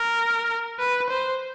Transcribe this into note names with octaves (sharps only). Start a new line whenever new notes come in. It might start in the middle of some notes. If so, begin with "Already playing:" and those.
Already playing: A#4
B4
C5